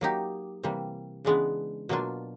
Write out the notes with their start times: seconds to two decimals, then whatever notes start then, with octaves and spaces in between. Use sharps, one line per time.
0.01 F#3 A#3 D#4 G4
0.63 C3 E3 G3 A#3
1.25 C#3 E3 G#3 B3 D4
1.89 B2 F#3 A#3 D4 F4